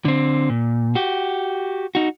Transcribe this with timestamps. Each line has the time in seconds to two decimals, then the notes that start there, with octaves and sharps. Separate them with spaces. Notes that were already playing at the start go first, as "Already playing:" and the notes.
0.05 D3 C4
0.50 A#2
0.95 F#4 G4
1.95 D#4 F#4